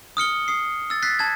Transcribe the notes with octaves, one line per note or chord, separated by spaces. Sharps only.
D#6 F6 C#7 G7
D#6 C7
E6 A6
F#6 A6 B6 C7
A5 G#6